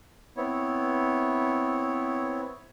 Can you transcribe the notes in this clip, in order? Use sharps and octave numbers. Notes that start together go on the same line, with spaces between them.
B3 C4 E4 C#5